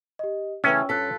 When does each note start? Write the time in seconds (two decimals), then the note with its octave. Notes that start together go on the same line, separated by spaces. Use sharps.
0.19 G4 D#5
0.64 C#3 E3 A3 C#4 G5 E6
0.89 G2 F4 A4 F#6 B6